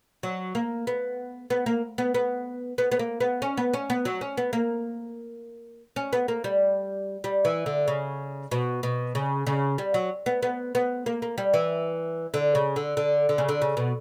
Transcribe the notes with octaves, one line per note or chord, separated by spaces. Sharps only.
F#3
A#3
B3
B3
A#3
B3
B3
B3
B3
A#3
B3
C#4
B3
C#4
B3
F#3
C#4
B3
A#3
C#4
B3
A#3
G3
G3
E3
D3
C#3
B2
B2
C#3
C#3
G3
F#3
B3
B3
B3
A#3
A#3
G3
E3
D3
C#3
D3
D3
D3
C#3
D3
C#3
B2